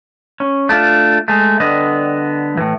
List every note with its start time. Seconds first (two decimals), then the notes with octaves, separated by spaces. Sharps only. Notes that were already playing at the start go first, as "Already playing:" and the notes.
0.40 C#4
0.69 A3 D4 F4
1.28 G#3 A3
1.60 D3 G3 B3 D#5
2.57 A2 E3